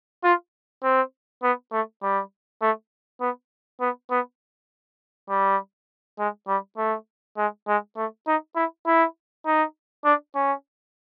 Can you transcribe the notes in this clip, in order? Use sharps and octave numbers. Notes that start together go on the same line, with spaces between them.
F4
C4
B3
A3
G3
A3
B3
B3
B3
G3
G#3
G3
A3
G#3
G#3
A3
D#4
E4
E4
D#4
D4
C#4